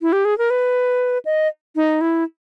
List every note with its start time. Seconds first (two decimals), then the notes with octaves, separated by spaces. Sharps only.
0.00 E4
0.13 G4
0.25 G#4
0.38 A#4
0.50 B4
1.25 D#5
1.76 D#4
2.01 E4